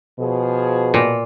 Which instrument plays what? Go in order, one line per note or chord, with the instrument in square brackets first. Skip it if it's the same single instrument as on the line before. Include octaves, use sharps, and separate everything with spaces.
[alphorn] B2 [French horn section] F3 G#4
[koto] A#2